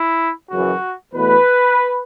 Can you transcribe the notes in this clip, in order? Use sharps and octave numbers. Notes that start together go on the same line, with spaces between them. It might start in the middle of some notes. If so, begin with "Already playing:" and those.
Already playing: E4
F#2 C#3 E3 F#4
E2 B2 A3 B4